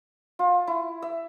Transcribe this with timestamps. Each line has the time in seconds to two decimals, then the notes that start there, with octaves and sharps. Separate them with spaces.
0.39 F4
0.67 E4
1.02 E5